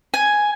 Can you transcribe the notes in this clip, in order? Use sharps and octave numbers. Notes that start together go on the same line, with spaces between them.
G#5